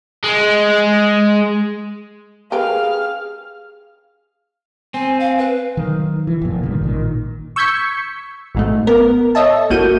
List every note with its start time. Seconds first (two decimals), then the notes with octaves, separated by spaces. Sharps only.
0.24 G#3
2.52 G4 G#4 A#4 B4 F5 F6
4.94 C4 G#5
5.20 F5
5.39 B4
5.77 D#3 F#3
6.27 E3
6.41 F#1 F2 A#2
6.62 G2 A#2 D#3 G#3
6.82 A1 A#2 D#3
7.56 C#6 E6 G6 G#6 B6 C#7
8.55 G#1 G#2 A3
8.87 B3 A#4
9.35 A4 C#5 D#5 E5 A5
9.70 G1 A#3 E4 F#4 G6 D#7